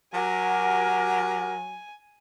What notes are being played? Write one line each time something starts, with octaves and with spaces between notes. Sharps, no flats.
F#3 F#4 G4 A#4 G#5